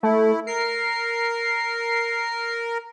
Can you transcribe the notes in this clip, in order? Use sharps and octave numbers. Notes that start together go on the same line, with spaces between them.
A3 E4
A#4 C7